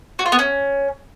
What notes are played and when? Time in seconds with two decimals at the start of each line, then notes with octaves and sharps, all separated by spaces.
0.19 F#4
0.26 F4
0.32 B3
0.39 C#4